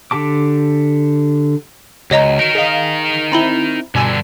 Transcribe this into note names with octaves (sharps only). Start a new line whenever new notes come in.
D3 G4 A5 D6
C#2 F#4 C#5 D#5 A#5
D#4 A#4 D7
G#4 D#5 F5
C4 E4 A#5 B5 G7
G2 B2 D3 G#5 E6